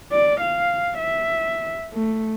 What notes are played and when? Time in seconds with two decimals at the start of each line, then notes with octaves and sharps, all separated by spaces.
0.12 D5
0.41 F5
0.99 E5
1.93 A3